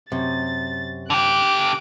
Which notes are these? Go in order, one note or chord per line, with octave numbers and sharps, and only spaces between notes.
F#2 C3 A6
D3 G4 D6 F#6 D7